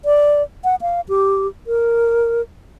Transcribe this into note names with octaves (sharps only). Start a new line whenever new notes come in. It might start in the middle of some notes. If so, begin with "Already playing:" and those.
D5
F#5
F5
G4
A#4